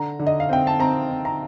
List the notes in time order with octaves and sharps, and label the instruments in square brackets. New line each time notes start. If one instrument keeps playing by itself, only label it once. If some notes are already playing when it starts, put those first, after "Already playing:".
Already playing: [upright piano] D3 A#5
D3
D#5
F5
C4 G5
A5
C4 A#5
C4
A#5